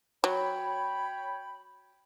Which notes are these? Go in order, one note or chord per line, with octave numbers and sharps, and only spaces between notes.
F#3 C#5 G5 B5